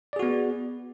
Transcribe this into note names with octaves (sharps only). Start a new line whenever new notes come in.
B3 F#4 G#4 D5